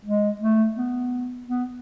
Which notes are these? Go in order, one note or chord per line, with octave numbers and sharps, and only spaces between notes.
G#3
A3
B3
B3